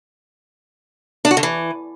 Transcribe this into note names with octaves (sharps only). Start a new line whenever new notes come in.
D4
F#4
D3
E3